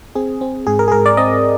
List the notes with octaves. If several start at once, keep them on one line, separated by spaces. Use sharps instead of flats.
C4 G#4
C4
G#2 G#4
A#4
G#4
G#2 A#4
D5
C4 D#5